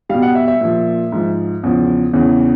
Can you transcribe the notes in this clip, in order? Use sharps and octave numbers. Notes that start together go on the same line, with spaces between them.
B2 G3 F5
F#5
E5
E5
A#2 F3
G#2 F3
E2 C#3 F3
E2 C#3 E3